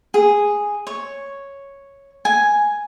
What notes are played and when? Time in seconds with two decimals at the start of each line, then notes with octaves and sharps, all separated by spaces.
0.14 G#4
0.87 C#5
2.25 G#5